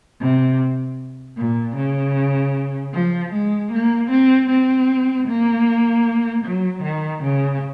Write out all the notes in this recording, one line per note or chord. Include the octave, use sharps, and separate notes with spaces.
C3
A#2
C#3
F3
G#3
A#3
C4
C4
A#3
F#3
D#3
C#3